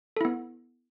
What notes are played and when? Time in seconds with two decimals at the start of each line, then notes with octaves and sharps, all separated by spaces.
0.17 A4
0.21 E4
0.25 B3